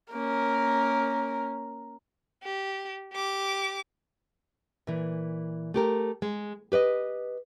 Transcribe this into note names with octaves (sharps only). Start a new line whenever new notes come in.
A#3 C#4 A#4
G4
G4 D6
A#2 E3
A3 G4 A#4
G#3
G4 B4 D5 D#5